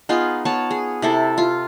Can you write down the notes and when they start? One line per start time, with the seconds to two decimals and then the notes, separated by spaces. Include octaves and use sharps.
0.09 B3 D#4 F4 G#4
0.45 B3 C#5 A5
0.71 G#4
1.02 C3 E4 A4
1.38 F4